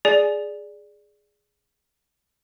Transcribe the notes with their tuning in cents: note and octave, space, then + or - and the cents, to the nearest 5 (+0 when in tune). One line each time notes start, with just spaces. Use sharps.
G#4 +0 D5 +0 G#5 +25